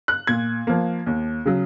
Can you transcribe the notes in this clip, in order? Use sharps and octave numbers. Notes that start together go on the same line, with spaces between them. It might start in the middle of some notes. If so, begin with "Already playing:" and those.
F#6
A#2 G#6
F3 A#3
D#2
C#3 F#3